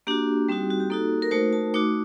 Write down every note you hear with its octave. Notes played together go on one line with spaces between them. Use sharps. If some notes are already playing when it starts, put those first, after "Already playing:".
A#3 D4 F#4 G4
G3 C4 D#4 F#4
F#4
G4
A#3 D#4 F#4 A4
A#4
A3 D#4 F#4 C5
A5
A3 D#4 F#4 D6